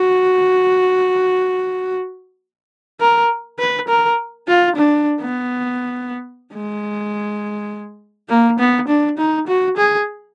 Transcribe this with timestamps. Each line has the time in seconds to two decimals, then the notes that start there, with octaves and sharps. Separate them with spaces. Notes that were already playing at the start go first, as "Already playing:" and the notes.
Already playing: F#4
3.01 A#4
3.59 B4
3.88 A#4
4.48 F4
4.76 D4
5.21 B3
6.53 G#3
8.29 A#3
8.59 B3
8.88 D4
9.18 D#4
9.47 F#4
9.77 G#4